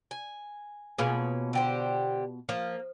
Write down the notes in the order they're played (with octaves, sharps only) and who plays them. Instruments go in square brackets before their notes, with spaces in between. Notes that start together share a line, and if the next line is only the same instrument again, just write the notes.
[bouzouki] G#5
[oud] B2 F4 G#4 [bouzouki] A#3 C#4
[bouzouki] D3 G4 C5
[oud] F3 [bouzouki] A#3